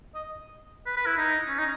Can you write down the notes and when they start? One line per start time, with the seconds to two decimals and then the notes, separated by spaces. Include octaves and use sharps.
0.15 D#5
0.86 B4
0.97 B4
1.06 E4
1.17 D#4
1.48 C#4
1.59 D#4